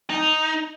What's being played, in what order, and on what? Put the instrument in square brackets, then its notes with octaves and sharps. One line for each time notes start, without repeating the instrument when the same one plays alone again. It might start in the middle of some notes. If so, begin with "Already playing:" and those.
[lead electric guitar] D#4